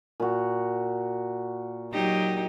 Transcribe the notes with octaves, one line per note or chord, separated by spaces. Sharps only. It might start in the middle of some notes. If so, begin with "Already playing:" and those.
A#2 F#4
F#3 D#4 G4